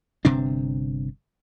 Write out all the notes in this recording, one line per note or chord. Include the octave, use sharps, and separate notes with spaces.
G1 C3 C4 D4